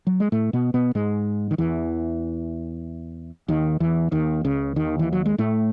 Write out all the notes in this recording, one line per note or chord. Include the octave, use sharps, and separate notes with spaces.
F#3
G#3
A2 A3
B2 B3
B2 B3
G#2 G#3
D#3
E2 E3
D#2 D#3
E2 E3
D#2 D#3
C#2 C#3
D#2 D#3
E3
F#3
G#3
A2 A3